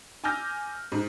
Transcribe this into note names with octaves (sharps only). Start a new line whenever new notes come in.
G#5 D6 E6 F6 G6 A#6
G#2